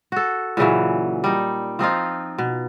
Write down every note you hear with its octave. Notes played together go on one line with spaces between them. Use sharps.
F#4 A4
A#2 C#3 E3 F#3
G3 D#4
F3 C4 D#4 F4
B2